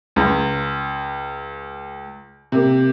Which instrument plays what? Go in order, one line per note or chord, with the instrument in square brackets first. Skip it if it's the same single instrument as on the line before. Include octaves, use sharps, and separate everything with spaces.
[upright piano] C#2
[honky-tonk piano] C3 A#3